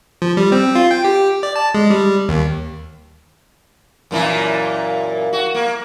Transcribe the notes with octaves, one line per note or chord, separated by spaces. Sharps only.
F3
G3
C4
F4
G5
G4
D5
A5
G#3
G3
D#2
F#2 A#2 E3
F#4
A#3